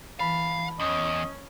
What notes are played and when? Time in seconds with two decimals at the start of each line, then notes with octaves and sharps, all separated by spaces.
0.19 E3 F5 A5 B5
0.80 E2 C#4 D#5